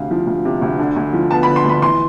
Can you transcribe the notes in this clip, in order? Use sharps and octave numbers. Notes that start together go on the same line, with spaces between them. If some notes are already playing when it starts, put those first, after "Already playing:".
Already playing: D2 C3 F5
F3
D2
C3
D2
D3
D2
F3
B3 A5
B5
D3
C6
D2
B5
E3 C6